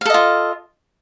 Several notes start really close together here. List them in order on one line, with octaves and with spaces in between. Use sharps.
F5 A4 D#5 F4